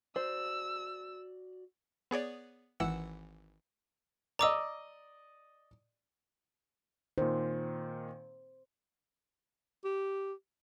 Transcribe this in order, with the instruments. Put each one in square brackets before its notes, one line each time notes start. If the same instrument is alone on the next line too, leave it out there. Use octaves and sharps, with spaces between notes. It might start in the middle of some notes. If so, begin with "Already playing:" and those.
[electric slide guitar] F#4 D5 [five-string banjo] C5 [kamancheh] E6
[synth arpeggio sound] B3 G#4 C#5 D5
G#1 E3 F#5 E6 E7
[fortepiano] D5 D#5 [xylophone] A#5 D6 E6
[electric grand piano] A#2 D#3 [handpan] C5
[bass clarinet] G4